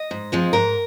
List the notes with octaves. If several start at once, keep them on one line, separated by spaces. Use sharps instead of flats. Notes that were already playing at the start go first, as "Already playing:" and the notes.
Already playing: D#5
G#2
F3 G#3 C4
G#2 A#4